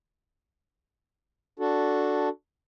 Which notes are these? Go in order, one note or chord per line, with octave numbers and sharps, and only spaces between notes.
D4 F#4 A4